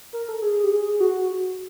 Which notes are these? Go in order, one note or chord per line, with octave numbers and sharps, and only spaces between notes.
A#4
A4
G#4
G4
G#4
F#4